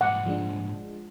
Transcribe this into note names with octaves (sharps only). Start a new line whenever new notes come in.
C2 G#2 F#5
F3 G#3 D4